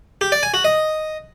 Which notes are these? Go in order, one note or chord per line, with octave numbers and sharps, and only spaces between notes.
G4
D5
G#5
F#4
D#5